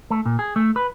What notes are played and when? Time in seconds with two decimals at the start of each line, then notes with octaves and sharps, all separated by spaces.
0.10 A3
0.26 A#2
0.39 G#4
0.56 A3
0.76 B4